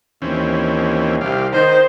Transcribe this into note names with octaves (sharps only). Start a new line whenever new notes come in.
D#2 E3 C4 C#4
C2 G4 F5
D#3 D#4 C5